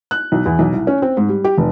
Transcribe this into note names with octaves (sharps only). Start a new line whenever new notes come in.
F#6
B1
E2
B1
C2
C#4
C4
G#2
G3
G4
F1